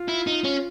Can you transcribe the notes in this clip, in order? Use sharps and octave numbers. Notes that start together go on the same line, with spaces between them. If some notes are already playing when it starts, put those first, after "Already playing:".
Already playing: F4
E4
D#4
C#4